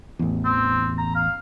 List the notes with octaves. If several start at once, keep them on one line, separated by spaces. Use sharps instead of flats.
A1 E2
C4
A#5
F5